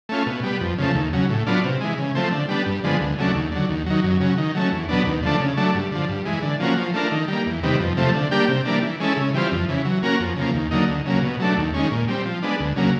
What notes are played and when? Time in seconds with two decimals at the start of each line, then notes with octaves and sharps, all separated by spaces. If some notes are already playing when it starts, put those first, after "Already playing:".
0.09 A3 C#4 F4
0.26 B2
0.43 G3 B3
0.60 F2
0.78 C#3 F3 A3
0.95 D#2
1.12 C#3 F#3
1.30 A2
1.47 F#3 B3 D4 F4
1.64 C3
1.81 E3 G#3
1.98 C#3
2.15 F3 A3 C4
2.32 D3
2.49 G3 B3 D4
2.66 G2
2.84 D3 F3 G#3 B3
3.00 D2
3.18 C#3 F#3 A3 D4
3.35 D#2
3.52 D3 F#3
3.69 D#2
3.86 D#3 F#3
4.04 F#2
4.20 C#3 F#3
4.38 D#3
4.55 F#3 A3 C#4
4.72 E2
4.88 B2 F#3 B3 D4
5.06 D#2
5.23 D3 F3 A3 D4
5.40 C#3
5.57 F#3 A3 D4
5.74 G2
5.91 D3 F3
6.09 G2
6.25 E3 G#3
6.43 D3
6.60 F3 A#3 C#4 F#4
6.77 F3
6.94 A3 D4 F4 A#4
7.12 D#3
7.28 G3 A#3
7.46 E2
7.63 C3 D#3 G3 B3
7.80 F2
7.97 C3 F3 A3
8.14 D3
8.31 G3 A#3 D4 G4
8.48 C3
8.65 E3 G3 A#3 D4
8.82 E3
9.00 G#3 C#4 E4 A4
9.17 C#3
9.34 E3 G3 C4 F4
9.52 F2
9.68 C#3 E3
9.85 F#3
10.02 A#3 C#4 F#4 A#4
10.20 F2
10.36 C#3 F3 A#3
10.54 D#2
10.71 D3 F#3 A#3 D#4
10.88 D2
11.06 C#3 F#3 A#3
11.22 B2
11.40 F#3 A3 D4
11.57 D#2
11.74 D#3 G#3 C#4
11.91 A#2
12.08 G3 C4
12.25 F3
12.42 G#3 B3 D4
12.59 D2
12.76 C#3 F#3 A#3